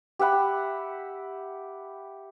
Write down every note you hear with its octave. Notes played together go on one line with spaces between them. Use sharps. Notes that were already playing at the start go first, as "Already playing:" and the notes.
G4 E5 F#5 B5